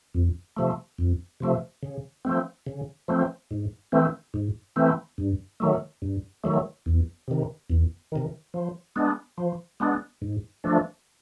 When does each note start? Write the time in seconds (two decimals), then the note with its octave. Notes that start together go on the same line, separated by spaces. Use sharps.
0.14 F2
0.57 C3 F3 A3
0.98 F2
1.40 C3 F3 A3
1.83 C#3
2.25 F3 A3 C4
2.66 C#3
3.08 F3 A3 C4
3.51 G#2
3.92 E3 A3 C4
4.34 G#2
4.76 E3 A3 C4
5.18 G2
5.60 D#3 F#3 A3
6.02 G2
6.44 D#3 F#3 A3
6.86 E2
7.28 C3 D#3
7.70 E2
8.12 C3 D#3
8.54 F3
8.96 G#3 B3 D4
9.38 F3
9.80 G#3 B3 D4
10.22 G#2
10.64 F3 A3 D4